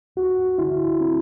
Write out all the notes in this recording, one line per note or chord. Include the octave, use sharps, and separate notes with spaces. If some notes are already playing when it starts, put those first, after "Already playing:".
D2 F#4
D3 E4
C4